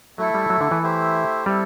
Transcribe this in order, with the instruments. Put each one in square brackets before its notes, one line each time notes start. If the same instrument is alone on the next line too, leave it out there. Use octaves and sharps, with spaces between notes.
[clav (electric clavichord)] F#3 [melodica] A3 E4 A4
[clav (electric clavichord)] G3
F#3
D3
E3
[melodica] A3 E4 G4 C5
[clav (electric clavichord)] G3 [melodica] C4 E4 A4